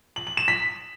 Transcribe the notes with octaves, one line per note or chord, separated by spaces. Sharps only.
F#7
F#7
E7
B6